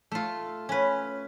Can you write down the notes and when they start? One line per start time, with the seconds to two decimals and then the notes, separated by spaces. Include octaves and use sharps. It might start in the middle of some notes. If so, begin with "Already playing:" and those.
0.12 A3 F4
0.69 C#4 B4